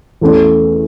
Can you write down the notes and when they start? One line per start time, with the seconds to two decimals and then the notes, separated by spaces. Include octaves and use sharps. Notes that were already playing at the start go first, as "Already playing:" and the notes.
0.21 E2 E3 A3 C#4